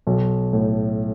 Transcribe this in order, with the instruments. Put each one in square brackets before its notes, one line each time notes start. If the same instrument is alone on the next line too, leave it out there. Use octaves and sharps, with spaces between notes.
[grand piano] B1
A2